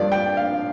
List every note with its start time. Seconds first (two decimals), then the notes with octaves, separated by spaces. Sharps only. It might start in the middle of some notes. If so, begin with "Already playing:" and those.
Already playing: G2 F3 A#3 D4 D5
0.12 G5
0.37 F5